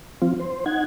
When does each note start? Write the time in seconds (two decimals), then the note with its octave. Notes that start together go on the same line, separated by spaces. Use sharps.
0.22 F3 C4 F4
0.40 C5
0.66 D#4 F#5 G#6